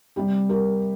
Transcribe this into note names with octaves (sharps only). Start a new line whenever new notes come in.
C3 G3 G4
G4 A#4